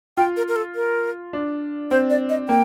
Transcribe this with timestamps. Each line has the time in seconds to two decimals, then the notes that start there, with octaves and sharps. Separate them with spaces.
0.17 F4 G5
0.37 A#4
0.48 A#4
0.56 A4
0.75 A#4
1.33 D4
1.91 C4 C5
2.10 D5
2.29 D#5
2.49 A#3 G5